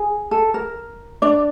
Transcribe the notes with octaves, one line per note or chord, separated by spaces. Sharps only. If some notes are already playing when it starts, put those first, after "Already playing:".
Already playing: G#4
A4
A#4
D4 D5